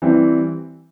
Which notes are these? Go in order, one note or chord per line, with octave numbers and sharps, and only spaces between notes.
E3 G3 C4